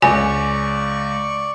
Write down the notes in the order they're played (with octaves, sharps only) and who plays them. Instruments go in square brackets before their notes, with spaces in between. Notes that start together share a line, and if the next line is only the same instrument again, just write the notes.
[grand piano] C#2 [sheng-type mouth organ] D5 C#6 [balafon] G#5